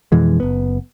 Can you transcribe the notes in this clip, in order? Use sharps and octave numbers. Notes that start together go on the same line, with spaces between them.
F2 B2 E3 G#3
F#1 B3